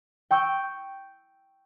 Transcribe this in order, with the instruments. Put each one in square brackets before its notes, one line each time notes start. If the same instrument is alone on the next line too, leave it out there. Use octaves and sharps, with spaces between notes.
[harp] G5 C#6 E6 G6